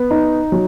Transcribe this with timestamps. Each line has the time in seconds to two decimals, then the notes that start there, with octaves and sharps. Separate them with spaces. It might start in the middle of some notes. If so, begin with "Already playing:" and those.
Already playing: B3
0.11 D#4
0.52 F#3